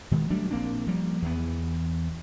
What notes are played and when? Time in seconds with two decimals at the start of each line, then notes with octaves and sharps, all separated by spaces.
0.11 B2 D#3 G#3
0.30 F#3 G3 A3 D4
0.50 A#1 A#3 C4 D4
0.87 F3 G3 A#3
1.22 E2 E3 B3